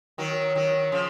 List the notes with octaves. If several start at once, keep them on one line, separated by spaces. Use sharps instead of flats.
D#3 F#3
D#3 F#3
C#3 F3